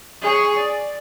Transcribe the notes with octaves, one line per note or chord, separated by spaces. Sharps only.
G#4 C#5
D5